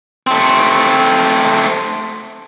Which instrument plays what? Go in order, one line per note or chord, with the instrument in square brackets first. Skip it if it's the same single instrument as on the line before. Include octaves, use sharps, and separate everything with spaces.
[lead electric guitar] A3 C4